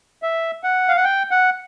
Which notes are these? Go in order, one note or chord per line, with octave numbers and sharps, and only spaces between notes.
E5
F#5
F5
F#5
G5
F#5